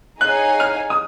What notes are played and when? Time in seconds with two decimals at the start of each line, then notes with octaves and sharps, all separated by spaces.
0.21 D#4 G#4 C#5 F5 G#5 F#6
0.60 F6
0.90 D#6